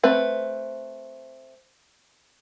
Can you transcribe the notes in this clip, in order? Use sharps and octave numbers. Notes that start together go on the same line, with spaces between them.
A3 C4 B4